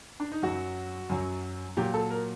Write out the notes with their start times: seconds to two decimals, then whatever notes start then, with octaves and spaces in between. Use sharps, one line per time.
0.20 D4
0.32 D#4
0.42 F#2 F#3 F#4
1.09 F#2 F#3
1.77 A#2 F#3 G4
1.94 A4
2.11 A#4